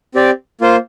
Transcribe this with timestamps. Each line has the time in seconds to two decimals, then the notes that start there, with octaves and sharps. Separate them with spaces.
0.14 C4 G4 D5
0.61 A#3 F4 C5